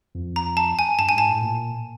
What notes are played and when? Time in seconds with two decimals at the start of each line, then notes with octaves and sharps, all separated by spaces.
0.15 F2
0.36 A#5
0.57 A5
0.79 G#5
0.99 G2 A5
1.09 G#5
1.15 G#2 A5
1.28 A2
1.41 A#2